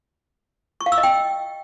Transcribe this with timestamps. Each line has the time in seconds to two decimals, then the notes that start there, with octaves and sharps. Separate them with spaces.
0.81 C#6
0.86 F5
0.92 E6
0.98 D#5
1.03 G5